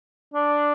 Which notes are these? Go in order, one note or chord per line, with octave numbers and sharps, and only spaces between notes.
D4